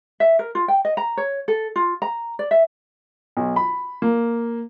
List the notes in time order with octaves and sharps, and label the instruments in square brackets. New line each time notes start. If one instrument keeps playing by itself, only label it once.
[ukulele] E5
A#4
F4
G5
D#5
A#5
C#5
A4
F4
A#5
D5
E5
[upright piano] B1
B5
A#3